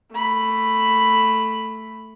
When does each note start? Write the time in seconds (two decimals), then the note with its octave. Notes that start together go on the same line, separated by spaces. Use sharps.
0.11 A3 B5